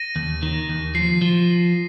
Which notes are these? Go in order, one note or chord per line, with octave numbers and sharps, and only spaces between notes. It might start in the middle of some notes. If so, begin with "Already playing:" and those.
Already playing: A#6 D#7
D#2
D#3
D#2
F3 C7
F3